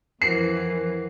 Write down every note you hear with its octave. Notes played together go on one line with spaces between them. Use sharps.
F2 E3 A#4 C5 F#5 C7